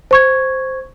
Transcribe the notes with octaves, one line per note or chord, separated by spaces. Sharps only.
C5 C#6 G#6